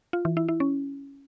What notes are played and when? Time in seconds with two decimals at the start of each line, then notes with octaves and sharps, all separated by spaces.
0.13 F4
0.25 E3
0.37 E4
0.49 E4
0.60 C#4